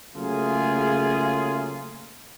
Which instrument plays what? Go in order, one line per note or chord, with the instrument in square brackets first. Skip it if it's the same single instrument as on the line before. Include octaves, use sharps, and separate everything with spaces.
[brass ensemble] C#3 F#3 A3 A#3 F4 G#4